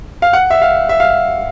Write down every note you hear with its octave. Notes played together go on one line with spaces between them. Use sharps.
F5
F#5
E5
F5
E5
F5